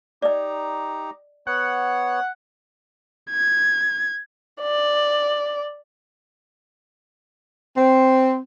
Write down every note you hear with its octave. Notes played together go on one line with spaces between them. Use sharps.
D#4 G4 D5 D#5 A#5
B3 C#5 F#5
G#6
D5
C4